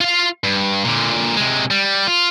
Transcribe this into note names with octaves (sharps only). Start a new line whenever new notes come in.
F4 F5
G2
A#2 D3
C3 G#3
G3
F4